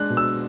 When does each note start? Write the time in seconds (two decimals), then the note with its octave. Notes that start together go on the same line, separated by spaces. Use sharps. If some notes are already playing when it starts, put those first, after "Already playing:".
Already playing: G#3 D4 F#6
0.10 B2
0.17 E6